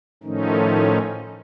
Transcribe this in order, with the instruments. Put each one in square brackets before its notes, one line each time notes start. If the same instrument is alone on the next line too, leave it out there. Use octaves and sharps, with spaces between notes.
[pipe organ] A2 D#3 F3 A3 C#4 D#4